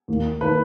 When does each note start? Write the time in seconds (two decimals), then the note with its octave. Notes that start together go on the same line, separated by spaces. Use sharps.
0.08 D#2 D#3 A#3
0.41 D#3 A#3 B4